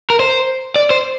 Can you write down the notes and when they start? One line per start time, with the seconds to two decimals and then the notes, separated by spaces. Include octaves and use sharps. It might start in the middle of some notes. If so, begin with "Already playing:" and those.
0.10 A#4
0.20 C5
0.76 D5
0.90 C5